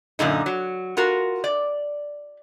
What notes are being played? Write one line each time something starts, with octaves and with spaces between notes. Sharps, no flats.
F#2 A#2 D3 D#4
F#3
F4 F#4 A#4
D5